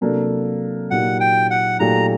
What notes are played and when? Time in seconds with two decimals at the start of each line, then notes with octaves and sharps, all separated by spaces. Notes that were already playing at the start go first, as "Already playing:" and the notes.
0.01 C3 F#3 A#3 D4 A4
0.91 A#2 F#3 A#3 D#4 G4 F#5
1.20 G5
1.51 F#5
1.80 A#2 F#3 A3 D#4 G4 A#5